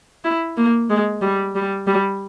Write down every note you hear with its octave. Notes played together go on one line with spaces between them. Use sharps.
E4
A#3
G#3
G3
G3
G3